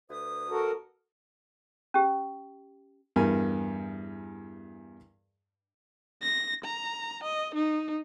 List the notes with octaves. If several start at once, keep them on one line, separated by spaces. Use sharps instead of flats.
D2 B4 D#6
F#4 A4 A#4
C#4 G4
E2 G2 A#4 G#5
A#6
A#5
D#5
D#4